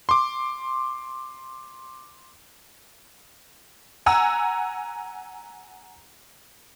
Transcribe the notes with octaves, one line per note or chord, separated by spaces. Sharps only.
C6 D6
F#5 G#5 A#5 E6